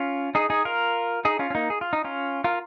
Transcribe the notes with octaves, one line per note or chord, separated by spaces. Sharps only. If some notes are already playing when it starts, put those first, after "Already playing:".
Already playing: C#4 F4
D#4 G#4
D#4 G#4
F4 A#4
D#4 G#4
C#4 F4
C#4
A#3 D#4
G#4
F4
D#4
C#4 F4
F4 A#4